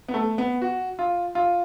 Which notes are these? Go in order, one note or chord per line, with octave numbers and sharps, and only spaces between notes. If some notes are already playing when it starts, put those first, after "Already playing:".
B3
A3
B3
F#4
F4
F4